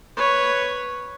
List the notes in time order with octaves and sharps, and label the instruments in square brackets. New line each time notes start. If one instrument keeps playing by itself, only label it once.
[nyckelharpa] B4 C#5